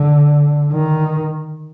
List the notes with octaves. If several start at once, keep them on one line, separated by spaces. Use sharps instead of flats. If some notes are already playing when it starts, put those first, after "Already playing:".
Already playing: D3
D#3